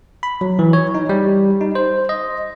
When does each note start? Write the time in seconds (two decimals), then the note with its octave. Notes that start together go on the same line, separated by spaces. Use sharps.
0.23 B5
0.41 F#3
0.59 E3
0.73 C#5
0.95 D#4
1.09 G3
1.61 D#4
1.75 C5
2.09 D#5